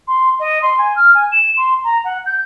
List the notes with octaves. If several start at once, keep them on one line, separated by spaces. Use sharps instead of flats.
C6
D#5
C6
G#5
F6
G#5
E7
C6
A#5
F#5
G6